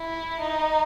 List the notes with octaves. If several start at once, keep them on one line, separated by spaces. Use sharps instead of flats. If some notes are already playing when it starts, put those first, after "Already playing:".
Already playing: E4
D#4